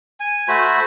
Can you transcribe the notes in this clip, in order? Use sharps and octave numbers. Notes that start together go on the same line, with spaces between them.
G#5
A3 F#4 C5 B5